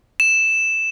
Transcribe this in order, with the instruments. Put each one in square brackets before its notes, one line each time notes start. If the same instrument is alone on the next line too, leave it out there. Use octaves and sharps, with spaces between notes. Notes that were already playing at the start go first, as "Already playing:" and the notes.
[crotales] E7